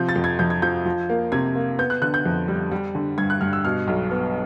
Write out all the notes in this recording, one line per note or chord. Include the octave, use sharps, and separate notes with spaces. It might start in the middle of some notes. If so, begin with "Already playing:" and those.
Already playing: C3 F3 G6
A6
F2
G#6
F2 G6
G#6
F3 G6
F3
A#3
C3 G#6
A#3
B3 G6
F#6
D3 F#6
G6
F2
G3
G3
D3
G2 G#6
F#6
G2 F6
E6
B2 F6
B1
B3